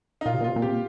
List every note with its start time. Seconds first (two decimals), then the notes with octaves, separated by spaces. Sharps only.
0.21 D#4
0.26 A#2 F4
0.34 C3
0.41 A#2
0.44 C3 F4
0.56 A#2
0.62 C3 G4
0.71 A#2